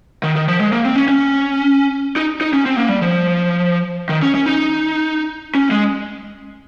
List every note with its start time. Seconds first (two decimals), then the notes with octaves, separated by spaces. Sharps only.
0.23 D#3
0.36 D#3
0.48 F3
0.60 G#3
0.72 A#3
0.85 C4
0.96 C#4
1.08 C#4
2.16 D#4
2.41 D#4
2.53 C#4
2.66 C4
2.77 A#3
2.89 G3
3.02 F3
4.09 D#3
4.22 C#4
4.35 C#4
4.46 D#4
5.55 C#4
5.71 G#3